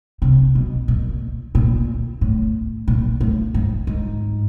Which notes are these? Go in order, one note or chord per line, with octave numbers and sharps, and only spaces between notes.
C3
B2
A#2
A#2
A2
A#2
A2
G#2
G#2